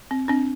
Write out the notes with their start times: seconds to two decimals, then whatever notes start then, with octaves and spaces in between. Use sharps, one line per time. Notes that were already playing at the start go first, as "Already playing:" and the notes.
0.11 C4
0.28 C4 D4